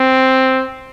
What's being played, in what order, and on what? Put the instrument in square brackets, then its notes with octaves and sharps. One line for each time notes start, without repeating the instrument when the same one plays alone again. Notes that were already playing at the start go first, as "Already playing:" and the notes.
Already playing: [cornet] C4